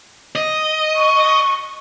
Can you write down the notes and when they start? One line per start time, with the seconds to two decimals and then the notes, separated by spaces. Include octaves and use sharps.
0.36 D#5
0.95 C#6